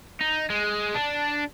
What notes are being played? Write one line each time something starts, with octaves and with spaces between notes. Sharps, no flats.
D#4
G#3
D4